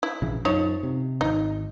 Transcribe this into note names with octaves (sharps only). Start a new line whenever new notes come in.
E4
A#1 C#3 E3
F#2 F3 D#4 C#5
C3
G#1 D#4